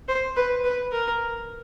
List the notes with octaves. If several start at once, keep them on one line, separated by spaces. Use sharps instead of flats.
C5
B4
B4
A#4